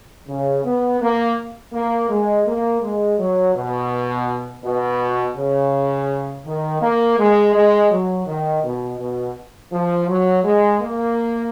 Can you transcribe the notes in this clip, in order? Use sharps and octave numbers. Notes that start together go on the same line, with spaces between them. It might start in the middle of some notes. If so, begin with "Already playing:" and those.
C#3
B3
A#3
A#3
G#3
A#3
G#3
F#3
B2
B2
C#3
D#3
A#3
G#3
G#3
F#3
D#3
B2
B2
F3
F#3
G#3
A#3